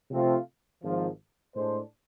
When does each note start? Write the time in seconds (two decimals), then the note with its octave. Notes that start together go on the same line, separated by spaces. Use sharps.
0.11 C3 F3 A3 C4 F4
0.83 G#1 G#2 F3
1.54 A2 G#3 D4 A4 C5